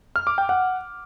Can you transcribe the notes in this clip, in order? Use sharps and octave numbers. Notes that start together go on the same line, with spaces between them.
F6
D6
G5
F#5